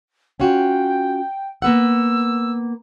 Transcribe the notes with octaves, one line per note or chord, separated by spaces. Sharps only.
C#4 F4 F#4 G5
A#3 B3 F#5 E6